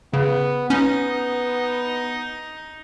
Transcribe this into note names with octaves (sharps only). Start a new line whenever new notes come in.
C#3 B3
B3 C#4 D#4